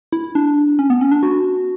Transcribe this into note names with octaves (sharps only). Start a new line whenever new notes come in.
E4
D4
C#4
B3
C#4
D4
F#4